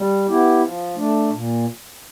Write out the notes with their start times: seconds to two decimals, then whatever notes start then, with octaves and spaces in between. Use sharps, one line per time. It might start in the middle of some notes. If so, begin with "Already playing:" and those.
Already playing: G3
0.26 B3 E4 G4
0.60 F3
0.96 A3 D4
1.31 A#2